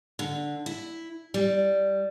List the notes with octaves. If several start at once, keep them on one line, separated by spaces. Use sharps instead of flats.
D3
E4
G3